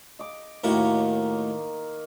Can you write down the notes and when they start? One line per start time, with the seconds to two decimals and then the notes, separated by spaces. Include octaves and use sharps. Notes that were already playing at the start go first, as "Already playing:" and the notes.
0.19 D#5 D6
0.64 D#2 A2 D#3 A#3 F#4